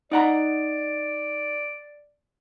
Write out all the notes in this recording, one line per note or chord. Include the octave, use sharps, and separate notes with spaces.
D#4 D5 F#5 A#5